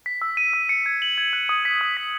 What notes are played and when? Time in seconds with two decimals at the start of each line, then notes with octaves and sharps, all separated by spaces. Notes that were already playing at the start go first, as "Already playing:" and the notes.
0.06 B6
0.22 E6
0.37 D#7
0.53 E6
0.69 C#7
0.86 G#6
1.02 F#7
1.18 G#6
1.33 F#6
1.49 D#6
1.65 B6
1.81 D#6
1.97 B6